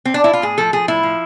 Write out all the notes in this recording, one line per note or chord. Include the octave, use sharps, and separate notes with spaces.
C4
D4
E4
F4
A2 G#4
F3 A4
F3 G#4
A2 E4
F3